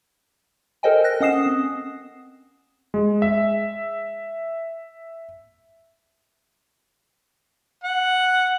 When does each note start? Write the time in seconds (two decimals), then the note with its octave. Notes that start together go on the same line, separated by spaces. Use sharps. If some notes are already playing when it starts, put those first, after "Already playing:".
0.83 A4 A#4 C5 D#5 G5 G#5
1.04 F#6 A#6
1.20 C#4 D#5 F#5 D#6 C7 E7
1.43 C4 D#6
2.94 G#3
3.22 E5
7.84 F#5